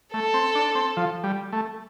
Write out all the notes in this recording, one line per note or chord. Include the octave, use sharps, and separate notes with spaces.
A3 A4
C4
D4
C4
F3
G3
A3